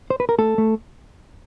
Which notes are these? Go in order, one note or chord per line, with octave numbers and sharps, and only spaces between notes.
C5
B4
A#4
A3 A4
A3